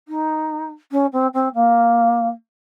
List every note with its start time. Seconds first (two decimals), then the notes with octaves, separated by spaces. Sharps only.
0.08 D#4
0.92 C#4
1.13 C4
1.34 C4
1.55 A#3